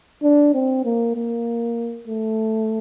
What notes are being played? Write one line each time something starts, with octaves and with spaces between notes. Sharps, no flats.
D4
C4
A#3
A#3
A3